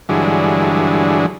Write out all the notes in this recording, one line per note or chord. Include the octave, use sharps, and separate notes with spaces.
G2 D3 E3 F#3 G#3